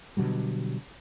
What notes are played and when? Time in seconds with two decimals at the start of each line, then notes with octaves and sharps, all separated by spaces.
0.17 B2 D3 F#3 G3